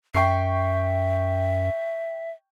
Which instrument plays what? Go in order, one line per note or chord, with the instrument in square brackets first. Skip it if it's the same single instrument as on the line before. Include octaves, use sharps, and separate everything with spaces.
[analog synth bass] F#2 [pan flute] E5 [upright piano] G5 C#6 C7